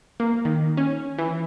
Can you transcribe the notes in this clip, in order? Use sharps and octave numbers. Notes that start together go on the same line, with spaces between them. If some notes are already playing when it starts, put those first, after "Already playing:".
A#3
D#3
C#4
E3